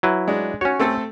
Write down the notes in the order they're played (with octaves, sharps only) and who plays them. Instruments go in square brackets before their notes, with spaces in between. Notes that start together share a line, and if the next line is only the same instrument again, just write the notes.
[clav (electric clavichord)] F#3 E4 B4
[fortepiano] G#3 D4
[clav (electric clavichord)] C#4 C#5 [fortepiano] F#4
[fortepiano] A3 C4 A4